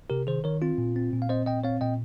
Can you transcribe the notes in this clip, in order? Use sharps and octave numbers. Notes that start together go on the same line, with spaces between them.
C3 G4 A#4
D#3 G#4 C5
D#3 A#4 C#5
C4 F4
A#2
C4
A#2
F5
C4 C5 D#5
A#2 D#5 G5
C4 C#5 F5
A#2 D#5 G5